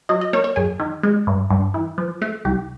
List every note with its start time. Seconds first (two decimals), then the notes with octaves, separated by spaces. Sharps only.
0.09 F#3 D#5
0.21 D#5
0.33 A#3 C#5
0.44 C#5
0.56 F#2 G#4
0.80 D#3
1.03 G#3
1.27 G2
1.51 G2
1.74 E3
1.98 F3
2.22 A3
2.45 C2 G4